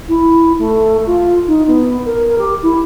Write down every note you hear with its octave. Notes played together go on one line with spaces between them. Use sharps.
E4
A3
F4
D#4
B3
A#4
G4
E4